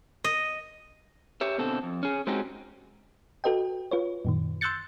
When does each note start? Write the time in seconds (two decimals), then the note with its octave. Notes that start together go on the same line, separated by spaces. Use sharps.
0.24 D#5
1.41 G4 C#5 E5
1.58 B2 D3 C4 A4
1.83 F2
2.03 C#4 G#4
2.27 G#3 C4 C#4 D#4 F#4 G4
3.44 F#4 A4 B4 D#5 G5
3.91 F4 B4 C#5
4.25 F#2 A#2 D#3
4.61 C6 E6 F#6 G6 A6 C#7